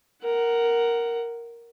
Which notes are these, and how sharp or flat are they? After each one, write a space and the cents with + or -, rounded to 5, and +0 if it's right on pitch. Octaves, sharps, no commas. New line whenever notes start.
A#4 +0 F#5 +15